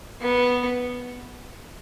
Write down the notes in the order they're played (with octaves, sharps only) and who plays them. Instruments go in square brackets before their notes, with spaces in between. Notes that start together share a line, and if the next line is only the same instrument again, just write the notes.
[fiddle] B3